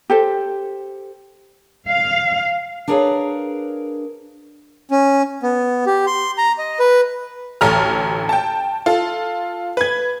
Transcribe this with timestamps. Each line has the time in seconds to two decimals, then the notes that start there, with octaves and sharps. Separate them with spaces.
0.10 G4 A4 C5
1.88 F5
2.88 D4 G#4 A#4 B4 C#5 F5
4.91 C#4
5.43 B3
5.86 G4
6.07 C6
6.38 A#5
6.58 D#5
6.79 B4
7.61 A1 D2 A4 A#5 F6
8.29 G5 A5
8.86 F4 A4
9.77 B4 G#6